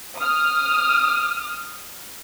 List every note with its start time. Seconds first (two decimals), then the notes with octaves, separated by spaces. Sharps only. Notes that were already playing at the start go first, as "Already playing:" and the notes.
0.17 D#6 F6